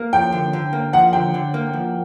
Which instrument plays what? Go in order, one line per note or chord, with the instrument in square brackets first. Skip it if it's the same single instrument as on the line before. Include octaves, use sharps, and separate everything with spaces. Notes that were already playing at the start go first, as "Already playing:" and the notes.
Already playing: [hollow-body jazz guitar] A#3
[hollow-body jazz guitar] F3 [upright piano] G5
[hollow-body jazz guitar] D3
D3
A#3
[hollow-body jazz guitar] F3 [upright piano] F#5
[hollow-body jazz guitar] D3 [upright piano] G5
[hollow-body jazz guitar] D3
A#3
F3